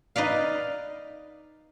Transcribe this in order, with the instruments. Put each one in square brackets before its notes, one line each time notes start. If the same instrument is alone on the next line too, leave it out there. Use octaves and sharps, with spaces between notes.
[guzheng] D#4 B4 D5 F5